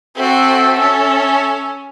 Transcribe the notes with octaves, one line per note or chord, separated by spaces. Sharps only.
C4 F#4 A4 E5
C#4